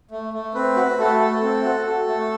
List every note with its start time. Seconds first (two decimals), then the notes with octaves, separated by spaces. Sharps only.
0.11 A3
0.34 A3
0.55 C4 B4
0.77 F#4
0.98 A3 A4
1.20 A3
1.42 C4
1.64 F#4
1.86 A4
2.08 A3